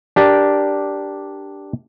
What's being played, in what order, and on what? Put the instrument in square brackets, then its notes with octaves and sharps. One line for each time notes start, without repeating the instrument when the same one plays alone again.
[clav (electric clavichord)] D4 G4 A#4 D5